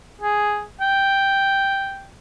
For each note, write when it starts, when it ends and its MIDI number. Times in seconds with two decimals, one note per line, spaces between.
0.21 0.63 68
0.81 2.08 79